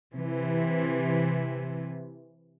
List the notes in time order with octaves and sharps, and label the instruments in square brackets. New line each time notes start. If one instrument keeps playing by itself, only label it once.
[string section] C3 E3